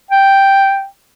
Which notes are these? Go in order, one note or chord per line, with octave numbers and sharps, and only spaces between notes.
G5